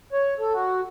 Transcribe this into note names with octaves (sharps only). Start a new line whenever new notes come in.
C#5
A4
F#4